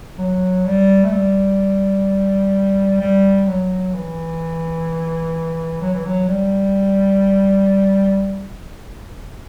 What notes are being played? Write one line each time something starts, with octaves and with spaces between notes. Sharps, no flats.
F#3
G3
A3
G3
G3
F#3
E3
F#3
E3
F#3
G3